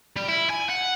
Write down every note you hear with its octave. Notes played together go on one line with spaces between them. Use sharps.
G3
E4
G#5
F#5